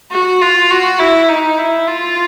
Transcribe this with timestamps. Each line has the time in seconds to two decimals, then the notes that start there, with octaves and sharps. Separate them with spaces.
0.11 F#4
0.41 F4
0.71 F#4
0.99 E4
1.29 D#4
1.58 E4
1.87 F4